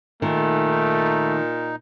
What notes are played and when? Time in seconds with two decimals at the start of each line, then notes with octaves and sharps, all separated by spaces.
0.22 A#2 D#3 A3
0.71 D#4